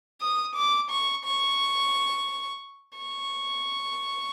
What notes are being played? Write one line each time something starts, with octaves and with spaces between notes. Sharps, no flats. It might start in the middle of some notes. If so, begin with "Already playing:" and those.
D#6
D6
C#6
C#6
C#6